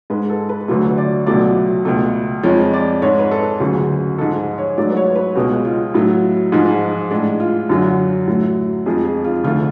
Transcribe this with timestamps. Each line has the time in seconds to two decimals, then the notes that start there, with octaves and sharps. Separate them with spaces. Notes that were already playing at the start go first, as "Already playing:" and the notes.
0.10 G#2 G#3 B4
0.30 A4
0.49 B4
0.68 D2 D3 F#3 A3 B4
0.98 D5
1.27 C#2 B2 F#3 A3 D5
1.85 C#2 B2 A3
2.43 F2 F3 G#3 C#5
2.73 D5
3.02 G#2 G#3 C#5
3.19 B4
3.31 A4
3.60 D2 C#3 F#3 G#4
4.18 G#2 F3 G#3 A4
4.58 C#5
4.77 G#2 F#3 A3 D5
4.91 B4
4.97 C#5
5.16 B4
5.35 C#2 B2 G#3 F#4
5.65 F4
5.94 A2 F#3 A3
6.52 G#2 F3 G#3
7.11 A2 G#3 D4
7.40 F4
7.69 F#2 D3 F#3
8.27 A2 F#3 A3
8.86 F2 F3 G#3 G#4
9.05 G#4
9.24 F4
9.44 D2 D3 F3 A3 F4